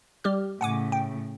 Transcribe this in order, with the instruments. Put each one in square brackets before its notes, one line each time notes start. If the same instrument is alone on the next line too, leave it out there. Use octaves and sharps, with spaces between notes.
[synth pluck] G3 G4 F6
[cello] A2 C#3 [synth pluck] F#5 G#5 D6
[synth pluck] G5